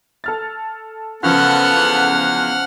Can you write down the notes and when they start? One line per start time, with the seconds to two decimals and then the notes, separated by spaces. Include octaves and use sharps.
0.24 A4 F6 A6
1.23 F#2 C#3 F3 B3 A4 F#5 F6
1.75 E2